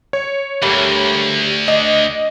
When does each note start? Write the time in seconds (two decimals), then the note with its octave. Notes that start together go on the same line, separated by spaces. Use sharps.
0.13 C#5
0.62 D2 G#2 G3 A3 A#3
1.68 D4 D#5